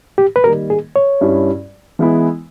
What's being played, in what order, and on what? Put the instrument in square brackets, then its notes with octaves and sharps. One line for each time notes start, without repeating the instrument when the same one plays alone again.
[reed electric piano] G4
B4
[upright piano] D#3 G3 A#3 [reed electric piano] A#4
[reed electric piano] G#4
C#5
[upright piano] G2 G3 C#4 E4
E3 G#3 B3 E4